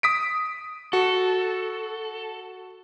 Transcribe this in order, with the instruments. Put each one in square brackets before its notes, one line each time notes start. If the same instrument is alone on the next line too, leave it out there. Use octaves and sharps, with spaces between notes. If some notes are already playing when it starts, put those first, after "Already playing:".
[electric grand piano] D#6 B6 D7
[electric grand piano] F#4 [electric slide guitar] A4